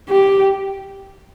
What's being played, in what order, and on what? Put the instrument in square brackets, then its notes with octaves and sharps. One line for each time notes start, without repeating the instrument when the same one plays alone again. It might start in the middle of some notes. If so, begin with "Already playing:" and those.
[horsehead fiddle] G4